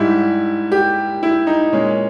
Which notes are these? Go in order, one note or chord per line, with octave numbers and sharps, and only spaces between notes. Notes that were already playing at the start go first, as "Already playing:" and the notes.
Already playing: G#2 G3 E4
G4
E4
D#4
A#2 G#3 C#4